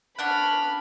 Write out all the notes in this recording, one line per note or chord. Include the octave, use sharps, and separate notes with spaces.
C#4 D4 F#5 B5 F6